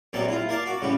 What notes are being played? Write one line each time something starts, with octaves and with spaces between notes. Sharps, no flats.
A#1 A#2 F#3 C4 A5
E4 F4
A#4 D5 F5 A5
F#4 D6
A2 C#3 G3